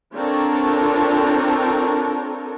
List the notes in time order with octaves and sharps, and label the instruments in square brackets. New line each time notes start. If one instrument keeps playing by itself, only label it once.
[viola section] C4 D4 F4 A4 A#4 C#5